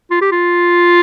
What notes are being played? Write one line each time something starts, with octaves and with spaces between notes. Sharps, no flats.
F4
G4
F4